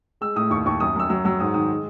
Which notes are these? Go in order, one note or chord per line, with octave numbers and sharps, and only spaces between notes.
G#3 E6
A2 D#6
D#2 C#6
D#2 C#6
F#2 D#6
F#2 E6
F#3 E6
F#3 E6
G#2 D#6
D#3 D#6
G#3